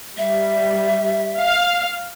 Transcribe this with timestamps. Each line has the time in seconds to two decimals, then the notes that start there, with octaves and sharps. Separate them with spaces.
0.18 G3 E5
1.39 F5